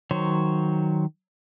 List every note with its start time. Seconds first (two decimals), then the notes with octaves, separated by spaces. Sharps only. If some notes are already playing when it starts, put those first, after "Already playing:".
0.11 D#3 F#3 C5 C#5